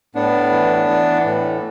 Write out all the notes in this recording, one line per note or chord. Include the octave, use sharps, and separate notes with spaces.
A2 B3 D4
E3
E3
A2